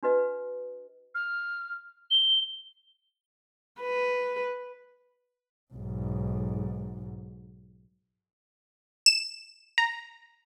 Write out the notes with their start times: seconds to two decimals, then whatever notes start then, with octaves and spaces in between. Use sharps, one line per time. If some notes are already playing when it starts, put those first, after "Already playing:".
0.03 D4 F#4 B4 D#5
1.14 F6
2.10 G7
3.81 B4
5.73 B1 G#2
9.06 E7
9.78 A#5